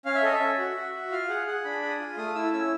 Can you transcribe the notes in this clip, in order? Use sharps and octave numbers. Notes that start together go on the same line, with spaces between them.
C#4 F5
E5
A4 D#5
E5
C#4
F#4
F#4
F#4
F4 F5
G#4 F#5
G#4 F#5
D4 B5
G#4
D#6
F4
A3 D#6
E4 E6
C#4 E6